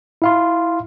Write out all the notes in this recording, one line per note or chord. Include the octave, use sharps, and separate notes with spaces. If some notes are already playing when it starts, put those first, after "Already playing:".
E4 F5 C6